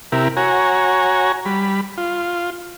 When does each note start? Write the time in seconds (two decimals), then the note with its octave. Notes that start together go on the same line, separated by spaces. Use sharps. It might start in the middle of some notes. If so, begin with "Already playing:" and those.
0.12 C3 E4 G4 A#4
0.37 F#4 C#5 G#5 A#5
1.46 G3 B5
1.98 F4